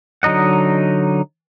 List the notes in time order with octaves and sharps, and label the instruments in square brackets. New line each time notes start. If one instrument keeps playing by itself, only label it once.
[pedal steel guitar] D3 F#3 D#4 D#5 F#5